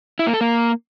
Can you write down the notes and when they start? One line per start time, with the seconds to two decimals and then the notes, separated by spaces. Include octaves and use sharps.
0.19 E4
0.26 A#3
0.34 A4
0.41 A#3